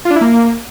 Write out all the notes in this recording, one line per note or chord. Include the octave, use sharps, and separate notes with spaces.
F4
D4
E4
A#3